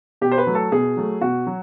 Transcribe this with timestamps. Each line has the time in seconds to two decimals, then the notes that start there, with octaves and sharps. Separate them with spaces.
0.21 B2 G4
0.31 C5
0.38 B4
0.47 F#3 A3
0.55 A4
0.72 B2 G#4
0.97 F#3 A3
1.21 B2 F#4
1.47 F#3